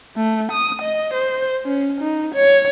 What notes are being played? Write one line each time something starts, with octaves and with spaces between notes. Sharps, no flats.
A3
D#6
D#5
C5
C#4
D#4
C#5